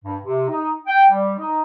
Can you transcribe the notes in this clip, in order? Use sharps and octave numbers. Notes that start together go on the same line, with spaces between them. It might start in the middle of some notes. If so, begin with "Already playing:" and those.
G2
C3
D#4
G5
G3
D#4